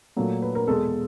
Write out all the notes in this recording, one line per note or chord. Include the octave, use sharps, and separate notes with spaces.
A#2 F#3 A3
B4
A#4
E2 B2 G#3 A4